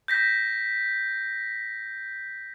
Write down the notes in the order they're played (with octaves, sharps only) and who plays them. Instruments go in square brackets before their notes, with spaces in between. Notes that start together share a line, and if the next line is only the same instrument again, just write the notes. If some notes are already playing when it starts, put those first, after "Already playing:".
[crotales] G6 A#6 B6